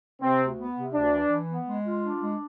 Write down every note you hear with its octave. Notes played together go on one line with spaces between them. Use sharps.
C3 C4
D2
B3
C3
D2 D4
E3
E3
B3
G#3
F4
D4
G#3